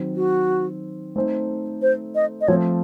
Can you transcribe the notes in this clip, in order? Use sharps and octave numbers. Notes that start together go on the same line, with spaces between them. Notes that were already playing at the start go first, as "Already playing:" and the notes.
Already playing: D#3 F#3 C4
F#4
A3 C4 D#4 A4 C5
C5
D#5
D#5
F3 A3 C4 C#5